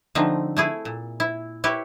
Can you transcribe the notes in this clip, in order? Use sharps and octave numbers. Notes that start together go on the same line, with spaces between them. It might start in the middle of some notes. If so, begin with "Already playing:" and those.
D3 F3 A3 C4 D#4
A3 E4 G#4
A#2
E4
E4 G4 B4 C#5